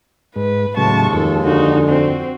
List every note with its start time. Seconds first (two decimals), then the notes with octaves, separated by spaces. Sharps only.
0.36 G#2 B4
0.77 D#2 A2 C#3 F#3 G#3 A5 C#6
1.13 F2 D#3 A4
1.43 D3 D#4 F#4
1.89 C4 F#4